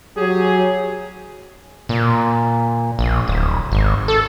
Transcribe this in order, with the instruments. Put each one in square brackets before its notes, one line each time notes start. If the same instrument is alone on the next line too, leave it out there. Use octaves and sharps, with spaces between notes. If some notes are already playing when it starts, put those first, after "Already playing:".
[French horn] F#3 [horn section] G4 G#4
[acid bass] A#2
A#1
D1
G#1
A4